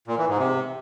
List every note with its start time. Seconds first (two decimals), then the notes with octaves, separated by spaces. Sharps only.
0.07 A#2
0.18 E3
0.28 G#2
0.38 C3